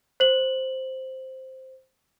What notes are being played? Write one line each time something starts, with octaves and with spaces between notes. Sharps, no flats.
C5 F#7